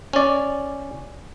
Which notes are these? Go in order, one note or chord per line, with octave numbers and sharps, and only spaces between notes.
C#4 D5